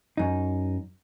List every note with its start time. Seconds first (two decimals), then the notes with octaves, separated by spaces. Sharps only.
0.17 F#2 D#4